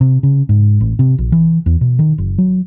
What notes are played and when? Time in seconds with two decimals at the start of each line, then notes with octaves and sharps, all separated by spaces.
0.01 C3
0.23 C#3
0.49 G#2
0.81 A1
0.99 C3
1.18 A#1
1.32 E3
1.66 E2
1.81 B2
1.99 D#3
2.18 F#1
2.38 F#3